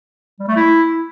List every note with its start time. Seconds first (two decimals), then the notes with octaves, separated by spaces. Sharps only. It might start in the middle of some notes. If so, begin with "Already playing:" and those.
0.39 G3
0.48 A3
0.56 E4